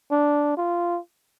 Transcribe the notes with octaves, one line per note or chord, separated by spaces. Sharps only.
D4
F4